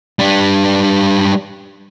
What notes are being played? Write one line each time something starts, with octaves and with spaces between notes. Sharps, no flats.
G3 D4